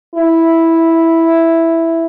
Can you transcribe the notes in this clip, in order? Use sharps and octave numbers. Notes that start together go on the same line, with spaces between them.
E4